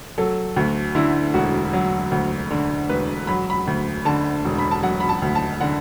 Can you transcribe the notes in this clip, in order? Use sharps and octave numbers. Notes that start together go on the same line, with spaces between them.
F#3 A4
D2 F#4
D3 E4
E1 F#4
F#3
D2
D3
E1 B4
F#3 B5
B5
D2
D3 A5
E1
B5
A5
F#3 F#5
B5
A5
D2
A5
D3 F#5